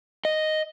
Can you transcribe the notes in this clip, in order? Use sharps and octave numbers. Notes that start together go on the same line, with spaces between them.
D#5